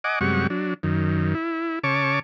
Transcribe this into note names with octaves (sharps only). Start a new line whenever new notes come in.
D#5 F#5 G#5 D6
F#2 C3 G3 G#3 F#5 C#6
F#3 D4
F#2 D#3
E4
C#3 C#5 A5 C#6 D6